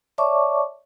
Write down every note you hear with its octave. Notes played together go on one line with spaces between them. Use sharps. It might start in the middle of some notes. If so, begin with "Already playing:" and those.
C#5 D5 E5 A5 C#6 D6